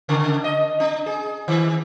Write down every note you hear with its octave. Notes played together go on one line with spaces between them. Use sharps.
C#3
D#5
D4
G#4
D#3